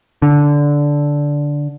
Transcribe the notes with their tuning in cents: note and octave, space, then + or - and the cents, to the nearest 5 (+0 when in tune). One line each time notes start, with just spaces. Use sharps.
D3 -10